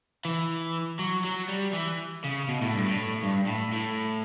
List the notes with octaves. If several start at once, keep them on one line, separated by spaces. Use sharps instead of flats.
E3
F#3
F#3
G3
E3
C#3
B2
A2
G2
A2
G2
A2
A2